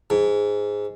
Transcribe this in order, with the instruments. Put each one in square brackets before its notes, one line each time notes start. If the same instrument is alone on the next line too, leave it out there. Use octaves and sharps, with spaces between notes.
[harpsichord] G#2